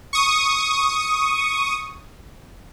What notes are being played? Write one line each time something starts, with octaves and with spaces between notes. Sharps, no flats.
C#6 D#6